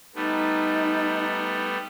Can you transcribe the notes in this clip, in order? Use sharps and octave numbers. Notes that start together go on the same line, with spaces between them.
G3 A3 B3 D#4